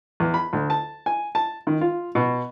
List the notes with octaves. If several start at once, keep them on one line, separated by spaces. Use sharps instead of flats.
E2
B5
D2
A5
G#5
A5
D#3
F4
B2